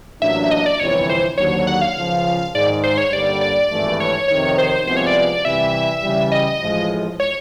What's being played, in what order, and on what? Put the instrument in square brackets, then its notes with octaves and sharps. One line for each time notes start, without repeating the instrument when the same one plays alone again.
[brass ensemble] A1 A2 F#3 A#3 D4 [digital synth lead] E5
[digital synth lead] E5
D#5
D5
[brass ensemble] G1 F2 C3 E3 [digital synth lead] C#5
[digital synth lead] C5
[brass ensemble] D#2 D3 F#3 [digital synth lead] C#5
[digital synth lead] F#5
F5
[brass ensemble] C#2 C#3 F3
[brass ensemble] G#2 D#3 G#3 [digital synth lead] D5
[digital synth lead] C5
C#5
[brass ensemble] G2 D3 G3 A#3 [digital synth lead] D5
[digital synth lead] D5
[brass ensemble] G#1 G2 E3 A3
[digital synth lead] C#5
[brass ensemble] F2 C3 D#3 [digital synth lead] C#5
[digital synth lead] C5
[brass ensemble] C2 C3 F3 G#3 B3 [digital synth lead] C5
[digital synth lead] C#5
D5
[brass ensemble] C3 E3 G3 [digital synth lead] E5
[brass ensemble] C#3 E3 G3
[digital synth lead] D#5
[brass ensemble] A1 A2 F3 G#3
[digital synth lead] C#5